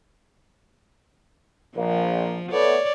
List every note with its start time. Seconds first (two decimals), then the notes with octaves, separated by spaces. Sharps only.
1.76 A#1 F3 A#3
2.52 A3 B3 C#5 D5